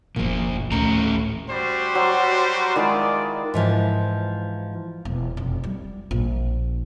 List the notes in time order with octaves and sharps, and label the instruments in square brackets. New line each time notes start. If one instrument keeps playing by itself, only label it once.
[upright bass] F#1 D#2 [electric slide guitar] A#2 F3
[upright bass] D2 D#3 [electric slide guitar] A2 C#4 A#5
[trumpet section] G3 F#4 C5
[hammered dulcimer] F#3
[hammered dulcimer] D#3 G#3 E4 [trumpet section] F4 D5
[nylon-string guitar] G#2 E3 F3
[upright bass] E1
F1
G3
A#1